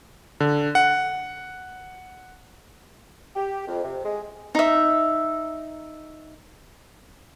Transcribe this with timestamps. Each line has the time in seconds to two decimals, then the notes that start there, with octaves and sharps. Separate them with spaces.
0.40 D3
0.75 F#5
3.36 G4
3.68 F2
3.84 C3
4.05 G#3
4.55 D#4 E5